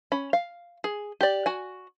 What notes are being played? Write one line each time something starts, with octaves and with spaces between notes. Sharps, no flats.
C#4 B5
F5
G#4
G4 D5
F#4 G#5